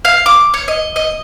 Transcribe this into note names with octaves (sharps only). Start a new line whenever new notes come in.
F5
D6
C#5
D#5
D#5